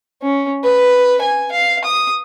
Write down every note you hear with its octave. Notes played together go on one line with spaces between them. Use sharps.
C#4
B4
G#5
F5
D#6